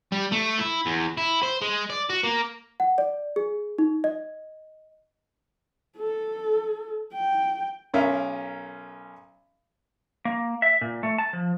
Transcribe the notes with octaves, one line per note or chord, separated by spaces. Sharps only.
G3
A3
E4
E2
E4
C5
G#3
D5
F#4
A#3
F#5
D5
G#4
D#4
D#5
A4
G5
B1 C#4 A#4 E5 F5
A#3
E5
A#2
A3
A5
F3